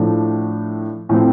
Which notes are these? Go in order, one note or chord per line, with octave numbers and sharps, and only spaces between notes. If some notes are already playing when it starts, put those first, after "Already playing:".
Already playing: A2 F3 A3 D4
A2 F3 A3 C4